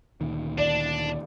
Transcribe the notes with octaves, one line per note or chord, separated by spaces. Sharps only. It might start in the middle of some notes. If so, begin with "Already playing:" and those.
D2 A#2 D#3
D4 D5